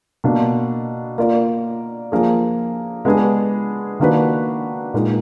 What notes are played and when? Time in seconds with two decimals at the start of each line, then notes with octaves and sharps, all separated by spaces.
0.24 B2 A#3 D4
1.18 A#3 F4 A#4 D5
2.12 F3 A#3 D4 G#4
3.05 G#3 B3 D4 G#4
4.00 D#3 A#3 D4 F#4 B4
4.94 A#2 G#3 D#4 A#4